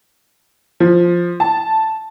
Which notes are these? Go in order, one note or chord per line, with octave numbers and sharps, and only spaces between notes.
F3
A5